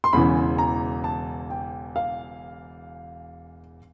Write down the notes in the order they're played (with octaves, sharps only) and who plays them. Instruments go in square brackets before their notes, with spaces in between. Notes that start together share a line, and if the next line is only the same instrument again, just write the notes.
[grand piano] C6
E1 E2 C#3 E3 B5
A#5
A5
G5
F5